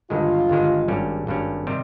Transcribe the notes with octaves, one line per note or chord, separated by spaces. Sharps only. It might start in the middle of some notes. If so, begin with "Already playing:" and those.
G1 G2 D#3 G#3 F4
G1 G2 D#3 G#3
G#1 G2 G3 C#4
G#1 G2 G3 C#4
C3 D#3 G3